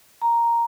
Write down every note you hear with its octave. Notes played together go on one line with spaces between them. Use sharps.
A#5